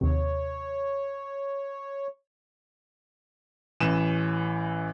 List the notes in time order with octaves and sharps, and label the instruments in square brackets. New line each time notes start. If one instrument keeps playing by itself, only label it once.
[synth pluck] D#2 C3 [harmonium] C#5
[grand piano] A1 E3 D#7 E7